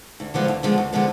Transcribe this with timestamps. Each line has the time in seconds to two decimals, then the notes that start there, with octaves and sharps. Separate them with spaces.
0.20 D2
0.34 D3 F3 G#3 B3
0.48 D2
0.63 D3 F3 G#3 B3
0.78 D2
0.93 D3 F3 G#3 B3